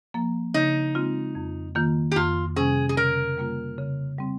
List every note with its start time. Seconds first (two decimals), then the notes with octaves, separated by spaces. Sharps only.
0.14 F3 A#3
0.54 C#3 D#4
0.95 G#3 C4 F4
1.35 F2
1.75 D#3 A#3 F4
2.12 G4
2.16 F2 F4
2.56 C3 G3 C#4 G#4
2.89 G#4
2.97 C#3 A#4
3.38 G3 A#3 F4
3.78 C#3
4.18 G3 C4